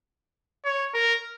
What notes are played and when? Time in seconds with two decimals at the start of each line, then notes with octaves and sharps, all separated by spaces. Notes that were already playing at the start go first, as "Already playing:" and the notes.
0.65 C#5
0.94 A#4